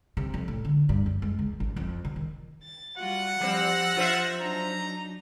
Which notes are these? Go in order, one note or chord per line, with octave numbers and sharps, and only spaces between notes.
C3
F2
A2
D3
G2
F#2
G#3
C#2
A1
F2
C3
D#3
A6
G3 F4 F#4 F#5
F3 G3 C4 E6 A#6
F4 C5 E5
F#3 D4 D#4 A#5